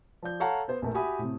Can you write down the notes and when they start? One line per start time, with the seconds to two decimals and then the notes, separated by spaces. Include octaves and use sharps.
0.23 F3 D5 G6
0.40 A4 C#5 F5 F#5 A5 A#5
0.68 B3 C5
0.82 A#1 A3 A#4
0.94 F#4 G4 E5 G#5 B5 D#6
1.19 A2 C3